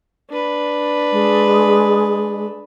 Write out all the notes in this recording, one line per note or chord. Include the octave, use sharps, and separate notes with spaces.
D4 B4
G#3